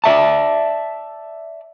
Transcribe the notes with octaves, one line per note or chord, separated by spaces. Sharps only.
D5 E5 A5